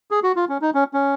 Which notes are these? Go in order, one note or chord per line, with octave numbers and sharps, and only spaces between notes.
G#4
F#4
F4
C#4
D#4
C#4
C#4